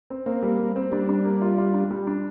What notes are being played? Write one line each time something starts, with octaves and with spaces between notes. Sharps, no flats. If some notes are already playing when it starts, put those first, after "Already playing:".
C4
A#3 C4
G3
G3
C4
G3 D4
D4
A#3
F4
F4
D4
G3
D4